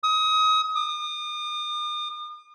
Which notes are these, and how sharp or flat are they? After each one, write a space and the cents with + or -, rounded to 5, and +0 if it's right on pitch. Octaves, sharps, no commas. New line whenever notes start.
D#6 +30
D#6 -45